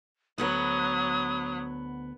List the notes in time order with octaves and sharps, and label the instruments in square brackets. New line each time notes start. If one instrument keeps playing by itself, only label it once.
[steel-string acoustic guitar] D2 B3 B4 [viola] F#3 [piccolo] D#6